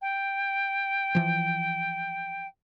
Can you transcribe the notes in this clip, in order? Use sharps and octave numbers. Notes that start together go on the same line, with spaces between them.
G5
E3 F3